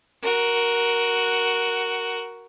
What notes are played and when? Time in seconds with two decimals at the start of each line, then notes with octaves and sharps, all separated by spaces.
0.23 F#4 A#4